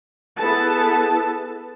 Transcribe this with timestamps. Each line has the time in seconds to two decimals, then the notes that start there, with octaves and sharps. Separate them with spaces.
0.38 B3 E4 G#4 A4 B4 A5